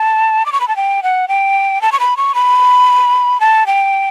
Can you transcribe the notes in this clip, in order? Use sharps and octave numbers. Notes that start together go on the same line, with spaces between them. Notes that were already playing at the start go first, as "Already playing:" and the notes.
Already playing: A5
D6
C#6
B5
A5
G5
F#5
G5
A5
C#6
B5
C#6
B5
A5
G5